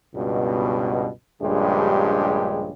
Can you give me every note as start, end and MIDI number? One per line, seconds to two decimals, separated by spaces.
0.15 1.09 37
0.15 1.09 43
0.15 1.09 47
1.41 2.71 34
1.41 2.71 43
1.41 2.71 49
1.41 2.71 56
1.41 2.71 67